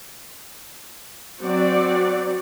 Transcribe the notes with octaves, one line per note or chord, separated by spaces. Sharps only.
F#3 C4 F#4 D5